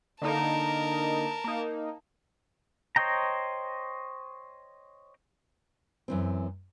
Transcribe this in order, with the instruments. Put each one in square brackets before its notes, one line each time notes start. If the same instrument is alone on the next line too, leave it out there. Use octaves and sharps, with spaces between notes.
[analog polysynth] D3 A#3 D#4 [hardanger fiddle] A#4 A5
[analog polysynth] A#3 D#4
[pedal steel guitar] C5 C#5 D#5 G5 A#5
[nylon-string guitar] F#2 E3 C4